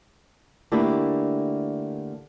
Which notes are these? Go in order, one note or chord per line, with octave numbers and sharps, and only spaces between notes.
D3 A3 A#3 D4 E4 G4